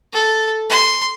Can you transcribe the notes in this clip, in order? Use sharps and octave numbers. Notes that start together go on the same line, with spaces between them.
A4
C6